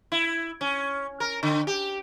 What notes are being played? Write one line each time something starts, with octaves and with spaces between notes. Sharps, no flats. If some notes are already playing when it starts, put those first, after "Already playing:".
E4
C#4
A#4
D3
G4